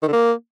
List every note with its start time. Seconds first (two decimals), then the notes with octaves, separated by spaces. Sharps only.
0.03 D#3
0.08 D3
0.13 A#3